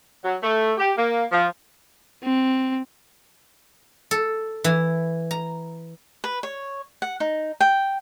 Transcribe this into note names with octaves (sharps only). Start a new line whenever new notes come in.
F#3
A3
G4
A#3
F3
C4
A4
E3
A#5
B4
C#5
F#5
D#4
G5